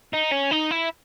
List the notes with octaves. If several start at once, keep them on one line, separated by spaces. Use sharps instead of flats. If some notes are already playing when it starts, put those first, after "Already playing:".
D#4
C#4
D#4
E4